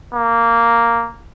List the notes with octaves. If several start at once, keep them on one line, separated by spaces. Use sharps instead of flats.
A#3